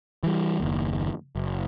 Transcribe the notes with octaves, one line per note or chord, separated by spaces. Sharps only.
E3 G3
F#1 D#2
F#1